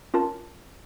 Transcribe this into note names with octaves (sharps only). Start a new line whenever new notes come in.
C#4 F4 A#4 A5